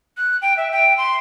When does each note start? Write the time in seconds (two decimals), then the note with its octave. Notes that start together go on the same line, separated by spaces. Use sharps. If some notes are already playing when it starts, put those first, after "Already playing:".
0.17 F#6
0.42 G5
0.57 E5
0.72 G5
0.98 C6